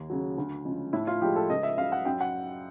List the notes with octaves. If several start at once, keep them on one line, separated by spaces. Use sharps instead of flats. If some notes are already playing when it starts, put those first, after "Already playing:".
Already playing: D#2
C#3 F#3
D2
C#3 F3 G#3
A2 E4
F4
F3 G#3 G4
A4
C#2 D#5
E5
C#3 F#3 F5
F#5
F#2 G5
F#5